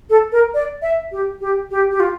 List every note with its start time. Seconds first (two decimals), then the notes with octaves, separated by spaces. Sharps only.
0.10 A4
0.32 A#4
0.54 D5
0.82 E5
1.12 G4
1.41 G4
1.71 G4
1.91 G4
2.00 F4